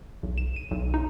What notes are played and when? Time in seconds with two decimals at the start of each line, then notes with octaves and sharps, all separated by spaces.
0.23 B1
0.38 E7
0.56 D#7
0.71 B1
0.94 D#4